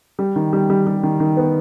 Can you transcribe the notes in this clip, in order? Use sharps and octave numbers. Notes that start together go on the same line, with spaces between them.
G3
D#3
G3
G3
G3
D#3
D#3
B3